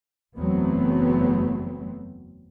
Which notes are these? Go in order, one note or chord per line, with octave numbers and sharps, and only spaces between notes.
F#1 E2 F#3 A3 B3 C4